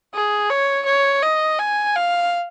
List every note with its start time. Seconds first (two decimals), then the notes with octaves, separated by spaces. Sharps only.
0.14 G#4
0.50 C#5
0.86 C#5
1.23 D#5
1.59 G#5
1.95 F5